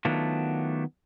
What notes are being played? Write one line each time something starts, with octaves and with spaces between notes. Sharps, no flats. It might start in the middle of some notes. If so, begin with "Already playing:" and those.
D#3 F#3 A3 B3 D4 F4